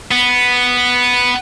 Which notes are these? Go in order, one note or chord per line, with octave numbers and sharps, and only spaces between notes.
B3